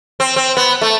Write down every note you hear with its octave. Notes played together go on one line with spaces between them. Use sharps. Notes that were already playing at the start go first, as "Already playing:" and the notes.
C4
C4
B3
A3